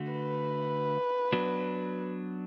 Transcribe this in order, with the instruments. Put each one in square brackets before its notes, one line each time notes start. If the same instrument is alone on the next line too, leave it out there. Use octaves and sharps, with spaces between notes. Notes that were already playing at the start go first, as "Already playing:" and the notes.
Already playing: [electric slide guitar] D3 A3 F#4
[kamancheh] B4
[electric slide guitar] F#3 B3 D4 F#4